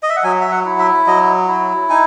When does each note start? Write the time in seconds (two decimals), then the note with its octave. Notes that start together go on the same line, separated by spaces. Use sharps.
0.03 D#5
0.09 E5
0.17 F#5
0.23 F#3 G#5
0.41 E5
0.51 F#5
0.65 E4
0.79 E5
1.07 F#3 D#5
1.48 E4
1.90 D#4 G#5